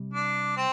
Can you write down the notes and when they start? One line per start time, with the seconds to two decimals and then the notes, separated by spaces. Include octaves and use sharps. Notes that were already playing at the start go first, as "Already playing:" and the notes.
Already playing: C3 G3
0.13 D4
0.57 C4